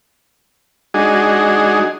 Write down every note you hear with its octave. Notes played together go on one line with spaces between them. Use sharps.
G#3 D4 D#4 F#4 G#4